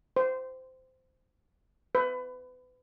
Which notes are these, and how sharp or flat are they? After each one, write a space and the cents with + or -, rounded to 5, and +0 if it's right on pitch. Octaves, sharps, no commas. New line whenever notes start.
C5 -15
B4 +30